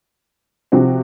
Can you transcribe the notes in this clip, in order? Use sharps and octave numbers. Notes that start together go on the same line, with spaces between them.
C3 F3 C4 F#4